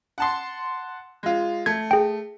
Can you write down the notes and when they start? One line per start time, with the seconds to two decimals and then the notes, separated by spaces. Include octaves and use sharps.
0.18 F#5 A5 C6
1.23 G#3 F4
1.66 A3 G#6
1.91 G#4 G5